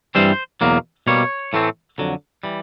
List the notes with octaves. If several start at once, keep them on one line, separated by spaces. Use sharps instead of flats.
G2 E3 G3 C4 C5
E2 B2 F#3 A#3
B2 G3 A#3 C#5
A2 E3 A3 C4
F2 D3 F#3
E3 G3